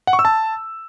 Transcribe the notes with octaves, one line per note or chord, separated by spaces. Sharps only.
F#5
C#6
E6
A5